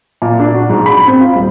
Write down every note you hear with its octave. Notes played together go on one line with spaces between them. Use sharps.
A#2
D4
F#4
G#2
B5
C4
F4
D#1